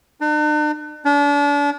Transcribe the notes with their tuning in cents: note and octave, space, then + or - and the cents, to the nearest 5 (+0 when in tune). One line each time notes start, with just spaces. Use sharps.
D4 +45
D4 -35